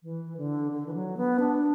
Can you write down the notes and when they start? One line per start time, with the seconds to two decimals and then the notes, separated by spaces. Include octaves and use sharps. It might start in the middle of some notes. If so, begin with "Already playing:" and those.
0.03 E3
0.37 D3
0.72 D3
0.86 E3
0.94 F#3
1.17 B3
1.40 D4